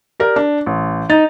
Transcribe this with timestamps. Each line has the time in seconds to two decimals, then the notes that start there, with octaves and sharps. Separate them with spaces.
0.20 G4 A#4 D5
0.36 D4
0.66 A1
1.10 D#4 A6